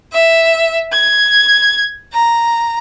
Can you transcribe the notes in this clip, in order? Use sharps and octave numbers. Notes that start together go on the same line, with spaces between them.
E5
G#6
A#5